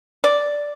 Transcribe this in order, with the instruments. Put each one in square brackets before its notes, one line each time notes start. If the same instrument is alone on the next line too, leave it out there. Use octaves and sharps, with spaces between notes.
[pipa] D5